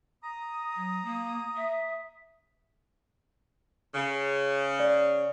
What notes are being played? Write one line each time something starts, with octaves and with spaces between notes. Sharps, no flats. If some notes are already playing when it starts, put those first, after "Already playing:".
A#5 D#6
F#3
A#3
E5
C#3
D5